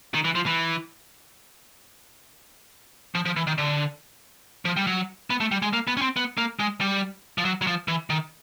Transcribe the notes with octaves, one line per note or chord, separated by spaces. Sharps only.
D#3
E3
F3
E3
F3
F3
E3
D#3
D3
F3
G3
F#3
B3
A3
G3
G#3
A#3
B3
C#4
C4
B3
A#3
G#3
G3
F3
F#3
F#3
F3
E3
D#3